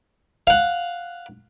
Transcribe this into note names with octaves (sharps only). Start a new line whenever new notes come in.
F5 F#5